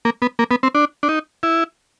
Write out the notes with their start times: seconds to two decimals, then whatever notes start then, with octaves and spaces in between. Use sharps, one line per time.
0.05 A#3
0.22 B3
0.39 A#3
0.51 B3
0.63 C4
0.75 D4
1.03 D4
1.09 D#4
1.43 E4